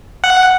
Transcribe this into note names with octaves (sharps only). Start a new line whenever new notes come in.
F#5